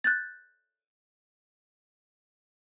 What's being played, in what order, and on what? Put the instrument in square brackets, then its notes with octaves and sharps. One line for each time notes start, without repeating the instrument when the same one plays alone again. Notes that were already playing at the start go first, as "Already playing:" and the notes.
[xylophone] F#6 G6 A6